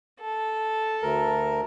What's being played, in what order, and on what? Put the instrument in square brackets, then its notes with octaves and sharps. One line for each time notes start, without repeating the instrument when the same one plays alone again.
[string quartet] A4
[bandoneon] D2 A#4